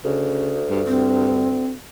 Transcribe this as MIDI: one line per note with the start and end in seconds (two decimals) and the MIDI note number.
0.04 1.76 38
0.04 0.56 49
0.69 0.82 43
0.87 1.60 43
0.87 1.66 60